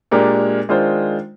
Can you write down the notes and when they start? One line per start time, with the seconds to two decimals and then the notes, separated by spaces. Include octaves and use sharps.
0.11 A#2 G#3 D4 G4 A#4
0.69 D#3 G#3 D4 F4 C5